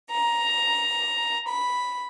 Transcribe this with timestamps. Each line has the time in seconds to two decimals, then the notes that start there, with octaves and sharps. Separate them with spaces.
0.10 A#5
1.49 B5